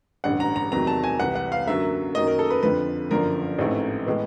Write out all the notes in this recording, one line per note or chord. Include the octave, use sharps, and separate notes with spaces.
A1 G2 D3 F#5
A#5
A#5
E2 C3 D#3 F#3 A#5
A5
G#5
C2 C3 E3 F#5
F#5
F5
F#2 D3 F#3 A#3 E5
F#2 D#3 F#3 A#3 D#5
A#4
A4
B4
F2 D3 F3 B4
G1 F#2 D3 F3 A#3 A#4
A1 G#2 E3 A3 C4
A2 E3 G#3 B3